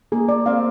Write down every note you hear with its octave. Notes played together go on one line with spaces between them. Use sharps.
A#3 G#4
D5
C4 F5